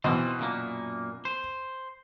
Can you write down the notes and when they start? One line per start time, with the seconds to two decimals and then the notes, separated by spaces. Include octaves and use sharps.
0.04 B2 E3 C4 F4 C5
0.39 F#2 A#2 A#3
1.25 C5